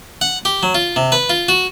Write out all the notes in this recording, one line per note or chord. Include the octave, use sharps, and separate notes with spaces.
F#5
G4
F#3
F4
C3
B4
F4
F#4